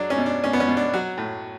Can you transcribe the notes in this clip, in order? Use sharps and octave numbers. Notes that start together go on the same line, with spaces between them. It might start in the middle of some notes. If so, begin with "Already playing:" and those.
Already playing: F#3 G#3 D4
C#4
B2
D4
B2 C#4
B3
C#4
B2
D4
F#3 F#4
A2